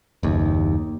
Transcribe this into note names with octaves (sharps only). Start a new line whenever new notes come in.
F#1 D#2